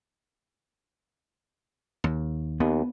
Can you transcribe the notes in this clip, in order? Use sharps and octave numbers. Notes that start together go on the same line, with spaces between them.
D#2
D#2 B3